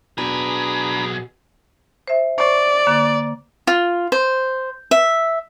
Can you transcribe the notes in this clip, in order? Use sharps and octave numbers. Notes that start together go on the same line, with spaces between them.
B1 B2 D4 G#4 A#5 B5
C5 E5
C5 D5 C#6
D3 A#3
F4
C5
E5